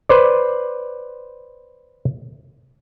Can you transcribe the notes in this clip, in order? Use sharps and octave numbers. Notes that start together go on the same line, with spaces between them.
B4 C5 D5